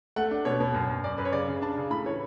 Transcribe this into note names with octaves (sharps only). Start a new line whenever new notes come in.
A3 F#5
D4
B2 C#5
B2
F#2
F#2
F#2 D5
F#2 B4
C#5
C#3 D5
C#3
D4 A5
C#3
A2 B5
E3 C#5